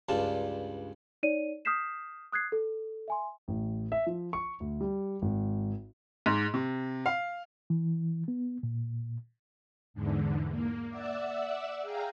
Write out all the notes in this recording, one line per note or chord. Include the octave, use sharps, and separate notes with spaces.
C#2 G2 D4 F4 A5
D#4 C#5 D5 D#7
D#6 F6 G6 B6 C7 E7
D#6 F#6 G#6 C7
A4
E5 G#5 C6
A1
E5
F3
C#6
D2
G3
G#1
G#2
C3
F5
E3
B3
A#2
E2 G#2 D3
A#3
D5 E5 F#5 E6
G#4 F5 G5 A#5